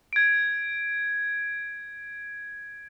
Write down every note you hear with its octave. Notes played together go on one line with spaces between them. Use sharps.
G#6 D7